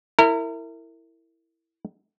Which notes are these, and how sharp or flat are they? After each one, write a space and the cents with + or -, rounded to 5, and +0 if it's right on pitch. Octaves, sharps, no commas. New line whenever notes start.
E4 +0 A#4 -35